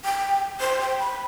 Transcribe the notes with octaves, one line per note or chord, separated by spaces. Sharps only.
G5
C5
G5
B5